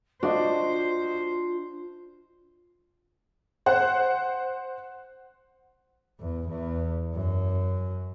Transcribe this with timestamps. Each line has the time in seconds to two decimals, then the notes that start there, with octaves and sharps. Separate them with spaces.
0.23 D4 F4 F#4 C5 D#5
3.66 C5 F#5
6.20 E2
6.48 E2
7.13 F#2